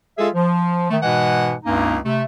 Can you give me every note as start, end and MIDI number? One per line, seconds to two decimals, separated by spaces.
0.18 0.29 56
0.18 0.29 65
0.18 0.29 68
0.18 0.29 69
0.18 0.29 76
0.35 0.86 53
0.91 0.98 51
0.91 0.98 57
1.03 1.54 44
1.03 1.54 47
1.03 1.54 52
1.03 1.54 56
1.03 1.54 78
1.66 1.98 37
1.66 1.98 43
1.66 1.98 58
1.66 1.98 61
1.66 1.98 63
2.05 2.23 48
2.05 2.23 57